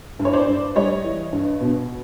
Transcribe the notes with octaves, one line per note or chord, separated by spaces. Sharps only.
G2
C#5
C5 D5
G2
G3 C#5 D#5
E3
G2
B2